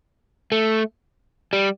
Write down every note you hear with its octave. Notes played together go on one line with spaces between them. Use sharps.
A3
G3